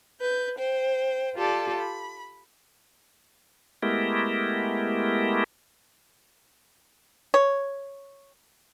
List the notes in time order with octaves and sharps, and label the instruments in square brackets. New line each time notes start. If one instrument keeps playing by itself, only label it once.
[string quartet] B4 G6
C5 G5
F4 G4 A4 D5
B5
[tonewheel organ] G#3 A3 B3 E4 G4 A#4
[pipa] C#5